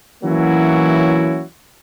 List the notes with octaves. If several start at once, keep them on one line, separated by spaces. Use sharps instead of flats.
E3 F#3 A#3 C#4 E4 F#4